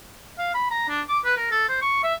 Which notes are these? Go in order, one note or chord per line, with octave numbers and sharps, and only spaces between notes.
F5
B5
A#5
D4
D6
B4
A#4
A4
C5
C#6
E5